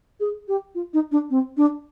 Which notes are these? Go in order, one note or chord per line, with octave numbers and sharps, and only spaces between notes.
G#4
G4
F4
D#4
D4
C4
D4